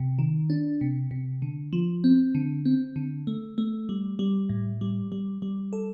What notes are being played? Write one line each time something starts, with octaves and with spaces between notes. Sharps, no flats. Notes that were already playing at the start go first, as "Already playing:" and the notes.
Already playing: C3
D#3
D4
C3
C3
D3
F3
C4
D3
C4
D3
A3
A3
G3
G3
A2
G3
G3
G3
A4